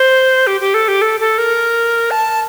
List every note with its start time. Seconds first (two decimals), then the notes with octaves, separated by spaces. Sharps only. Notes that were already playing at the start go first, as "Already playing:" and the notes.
Already playing: C5
0.47 G4
0.60 G4
0.74 A4
0.88 G4
1.01 A4
1.20 A4
1.38 A#4
2.11 A5